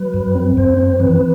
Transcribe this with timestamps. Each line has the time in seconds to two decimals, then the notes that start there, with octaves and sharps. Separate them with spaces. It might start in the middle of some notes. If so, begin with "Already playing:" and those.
Already playing: F#3 B4
0.14 F#2
0.35 C4
0.57 F#2 C5
0.78 C4
1.00 E3 B4